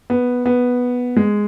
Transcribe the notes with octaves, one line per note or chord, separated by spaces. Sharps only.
B3
B3
G#3